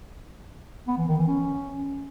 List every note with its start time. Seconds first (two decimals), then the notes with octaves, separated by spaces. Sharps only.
0.88 B3
0.98 E3
1.08 D#3
1.18 E3
1.28 C#4